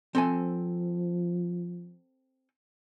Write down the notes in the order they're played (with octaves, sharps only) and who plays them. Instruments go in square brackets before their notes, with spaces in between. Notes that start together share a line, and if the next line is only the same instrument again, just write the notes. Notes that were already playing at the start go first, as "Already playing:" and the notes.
[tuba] F3 [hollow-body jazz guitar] C4 A4 G#5